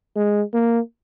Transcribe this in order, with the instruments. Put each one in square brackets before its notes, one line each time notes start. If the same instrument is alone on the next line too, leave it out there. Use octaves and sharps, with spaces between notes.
[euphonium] G#3
A#3